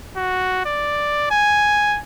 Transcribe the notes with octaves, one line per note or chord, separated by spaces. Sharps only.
F#4
D5
G#5